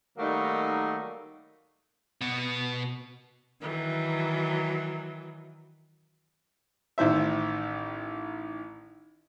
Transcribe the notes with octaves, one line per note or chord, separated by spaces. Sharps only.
D#3 F#3 G3 A3 A#3 D#4
B2 B3
D#3 E3 F#3
A1 D#3 C5 E5